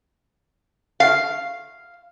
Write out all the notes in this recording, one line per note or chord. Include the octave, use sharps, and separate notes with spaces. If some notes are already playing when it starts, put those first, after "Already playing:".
F5